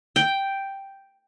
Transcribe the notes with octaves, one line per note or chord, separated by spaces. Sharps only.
G5